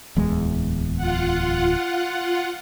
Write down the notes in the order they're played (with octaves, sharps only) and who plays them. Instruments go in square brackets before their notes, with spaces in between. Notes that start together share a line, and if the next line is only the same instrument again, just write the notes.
[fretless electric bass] D1 E2 G#3
[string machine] F4 F#5